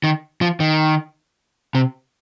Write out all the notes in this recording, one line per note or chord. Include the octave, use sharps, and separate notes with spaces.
D#3
F3
D#3
C3